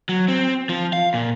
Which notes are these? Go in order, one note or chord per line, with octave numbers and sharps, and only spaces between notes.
F#3
C4
F3
F5
A#2